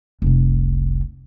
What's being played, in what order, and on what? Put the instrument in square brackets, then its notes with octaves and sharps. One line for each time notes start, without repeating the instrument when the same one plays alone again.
[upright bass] F1 C2